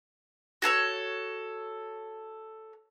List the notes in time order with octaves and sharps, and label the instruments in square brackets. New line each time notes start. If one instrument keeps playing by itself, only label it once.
[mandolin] F#4 G#4 A4 C#5